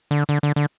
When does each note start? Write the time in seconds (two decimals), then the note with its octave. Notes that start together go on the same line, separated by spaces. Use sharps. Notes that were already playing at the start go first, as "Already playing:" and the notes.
0.11 D3
0.29 D3
0.43 D3
0.56 D3